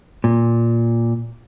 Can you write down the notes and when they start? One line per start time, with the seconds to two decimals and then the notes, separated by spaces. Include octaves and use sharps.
0.24 A#2